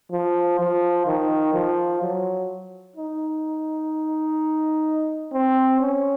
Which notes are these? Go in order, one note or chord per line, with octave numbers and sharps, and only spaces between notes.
F3
F3
D#3
F3
F#3
D#4
C4
C#4